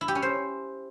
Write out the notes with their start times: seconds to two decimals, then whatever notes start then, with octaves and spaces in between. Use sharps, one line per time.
0.01 E4
0.08 G4
0.15 C#4
0.22 C5